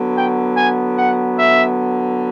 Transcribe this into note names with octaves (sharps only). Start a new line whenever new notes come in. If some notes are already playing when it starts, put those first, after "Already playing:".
Already playing: D3 F#3 B3
G5
G#5
F#5
E5